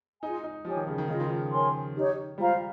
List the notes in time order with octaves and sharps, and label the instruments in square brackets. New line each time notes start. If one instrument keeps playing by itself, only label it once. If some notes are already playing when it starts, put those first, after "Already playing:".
[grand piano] D#4 [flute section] F4 G#4 D#5 G#5
[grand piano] D#4
[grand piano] F3 [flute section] G4 C#5 G#5
[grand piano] D#3
C#3
D#3
[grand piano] C#3 [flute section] F4 G#4 D#5
[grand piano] D#3
F3
[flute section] A#4 C#5 G#5 C6
D#4 G4 C#5
[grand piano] G3 [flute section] F4 C5 F5 A#5